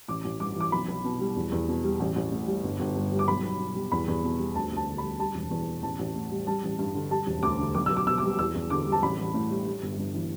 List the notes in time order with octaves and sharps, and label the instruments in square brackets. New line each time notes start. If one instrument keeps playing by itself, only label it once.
[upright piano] A1 D6
A1
G2 D6
E3 D6
B1 B5
B1
B2
G3
E2
E2
B2
G3
A1
A1
A2
G3
G1
G1
G2
G3
D6
B1 B5
B1
B2
G3
E2 B5
E2
B2
G3
D2 A5
D2
A5
D3
B5
G3
G3 A5
E1
E2
B2
A1 A5
A1
A2
G3
G3 A5
A1
G2
D3
G3 A5
E1
D2 D6
D3
B1 D6
B1 E6
D6
B2 E6
D6
G3
E2 E6
E2
D3 D6
G3
A5
A1 B5
A1
A2
G3
G3
G1
G2
E3